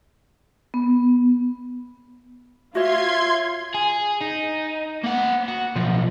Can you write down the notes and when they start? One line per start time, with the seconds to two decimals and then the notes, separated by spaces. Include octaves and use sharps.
0.74 B3
2.75 F4 F#4 C#5 E5 C6 G#6
3.74 G#4
4.21 D#4
5.03 A#3 F#5
5.48 F#4
5.76 B1 F3